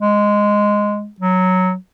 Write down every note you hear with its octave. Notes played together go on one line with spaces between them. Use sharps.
G#3
F#3